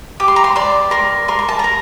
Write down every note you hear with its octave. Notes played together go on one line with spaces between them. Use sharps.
G4 D6
C6
A#5
C6
D5 C6
A#4 C6
A#4 C6
A#5
A5
A#4 A#5